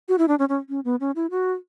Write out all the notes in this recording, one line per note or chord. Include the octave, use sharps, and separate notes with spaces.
F#4
E4
D4
C#4
C#4
C#4
B3
C#4
E4
F#4